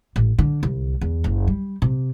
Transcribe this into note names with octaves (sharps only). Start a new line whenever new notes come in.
A1
D3
C2
E2
F#1
G3
C3